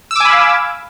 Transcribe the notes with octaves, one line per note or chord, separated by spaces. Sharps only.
F5 G#5 B5 D6 E6